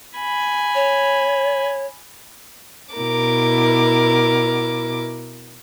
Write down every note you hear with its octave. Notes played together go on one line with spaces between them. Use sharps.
G#5 B5
C#5
B2 E4 A#4 D6